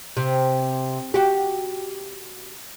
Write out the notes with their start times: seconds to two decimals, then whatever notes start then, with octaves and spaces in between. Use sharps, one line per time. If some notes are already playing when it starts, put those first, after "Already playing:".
0.17 C3
1.14 F#4 G4